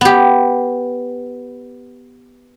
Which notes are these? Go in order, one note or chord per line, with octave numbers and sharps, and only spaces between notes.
B3 G4